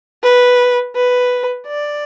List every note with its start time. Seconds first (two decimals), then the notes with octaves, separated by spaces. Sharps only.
0.23 B4
0.95 B4
1.66 D5